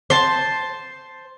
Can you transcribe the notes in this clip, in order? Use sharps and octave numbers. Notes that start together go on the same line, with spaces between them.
C5 A5